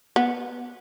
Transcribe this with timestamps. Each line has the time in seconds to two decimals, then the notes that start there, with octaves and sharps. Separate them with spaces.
0.16 B3